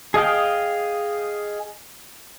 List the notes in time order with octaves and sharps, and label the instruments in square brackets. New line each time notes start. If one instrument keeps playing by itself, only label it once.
[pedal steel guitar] G#4 D#5 F5 G5